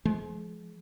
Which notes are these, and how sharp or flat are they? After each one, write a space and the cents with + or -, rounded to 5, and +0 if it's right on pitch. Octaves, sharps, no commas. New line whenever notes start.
F3 -15 G#3 +35